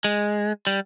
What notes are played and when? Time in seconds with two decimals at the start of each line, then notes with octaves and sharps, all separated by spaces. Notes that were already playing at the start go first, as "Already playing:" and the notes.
0.04 G#3
0.67 G3